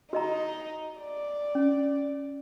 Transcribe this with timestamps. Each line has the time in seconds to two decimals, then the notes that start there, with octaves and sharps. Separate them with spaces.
0.13 D#4 F#4 D#5 A#5
1.00 D5
1.55 C#4